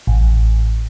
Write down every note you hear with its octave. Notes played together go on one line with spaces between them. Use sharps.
A1